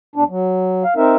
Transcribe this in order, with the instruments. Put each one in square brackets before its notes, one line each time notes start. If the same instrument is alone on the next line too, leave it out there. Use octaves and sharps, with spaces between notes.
[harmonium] E2 D4
F#3
F5
C4 D#4 A#4 E5